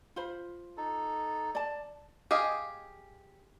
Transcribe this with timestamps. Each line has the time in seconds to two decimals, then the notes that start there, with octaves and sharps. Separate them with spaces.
0.16 F4 C5 B5
0.77 D#4 A4
1.55 D5 A5
2.31 G4 G#4 D#5 F5 G#5